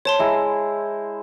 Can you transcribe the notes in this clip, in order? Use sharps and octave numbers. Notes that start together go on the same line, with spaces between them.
C5 C#5 A5 C6
G#3 E4 A#5